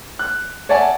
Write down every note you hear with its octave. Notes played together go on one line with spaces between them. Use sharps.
F#6
C#5 D5 E5 F#5 G#5 A5